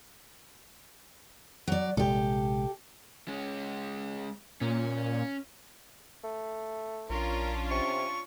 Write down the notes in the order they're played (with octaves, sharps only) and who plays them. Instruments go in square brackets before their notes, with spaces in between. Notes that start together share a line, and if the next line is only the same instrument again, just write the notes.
[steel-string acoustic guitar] F#3 D5
[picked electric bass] A#1 C3 G#3 [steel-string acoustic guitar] G4 A4
[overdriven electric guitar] G#3 C#4
[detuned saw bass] A#2 [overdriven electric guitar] C#4
[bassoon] A3
[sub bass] A#1 [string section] C#4 D4 F4 [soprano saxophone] A#4
[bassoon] C3 [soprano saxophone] C#6